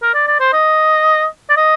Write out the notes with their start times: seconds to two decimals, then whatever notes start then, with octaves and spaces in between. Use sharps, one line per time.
0.02 A#4
0.14 D5
0.27 D5
0.40 C5
0.53 D#5
1.50 D5
1.57 D#5